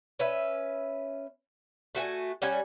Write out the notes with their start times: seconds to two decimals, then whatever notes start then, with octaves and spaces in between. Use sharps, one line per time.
0.19 C#4 B4 E5
1.95 A3 F#4 F#5 G#5
2.42 G3 C#4 F#5 G#5